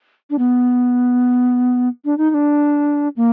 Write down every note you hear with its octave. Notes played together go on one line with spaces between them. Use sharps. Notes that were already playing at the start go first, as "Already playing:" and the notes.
D4
B3
D4
D#4
D#4
D4
A#3